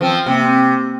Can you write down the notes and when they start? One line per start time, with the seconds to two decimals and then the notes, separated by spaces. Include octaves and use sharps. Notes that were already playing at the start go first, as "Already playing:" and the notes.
0.01 F3 C4
0.26 C3 A#3
0.45 C4